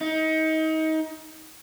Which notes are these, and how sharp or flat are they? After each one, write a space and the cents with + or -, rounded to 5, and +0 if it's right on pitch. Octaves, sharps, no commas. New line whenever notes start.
D#4 +30